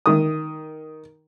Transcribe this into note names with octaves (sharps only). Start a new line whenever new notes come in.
D#3 D#6